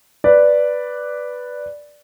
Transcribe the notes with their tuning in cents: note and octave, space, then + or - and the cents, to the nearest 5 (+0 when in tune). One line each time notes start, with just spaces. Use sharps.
B4 +0 D5 +0